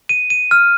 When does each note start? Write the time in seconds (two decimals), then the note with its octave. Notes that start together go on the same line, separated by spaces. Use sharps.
0.09 D#7
0.30 D#7
0.51 F6